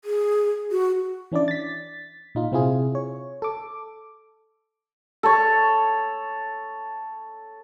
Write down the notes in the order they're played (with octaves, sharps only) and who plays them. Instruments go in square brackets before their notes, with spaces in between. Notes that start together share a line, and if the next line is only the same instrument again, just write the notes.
[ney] G#4
F#4
[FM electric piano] E3 C#4 D4 E4 D5
A6 B6
A#2 D#4 F4
C3 C4 E4 F4 G#4
C#5
A4 D6
[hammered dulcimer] A4 C#5